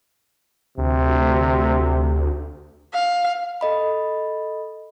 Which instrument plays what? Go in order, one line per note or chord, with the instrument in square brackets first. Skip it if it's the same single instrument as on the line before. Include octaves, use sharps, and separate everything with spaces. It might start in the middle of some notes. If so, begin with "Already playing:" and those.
[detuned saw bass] D2 [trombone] C3
[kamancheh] F5
[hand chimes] A4 D#5 B5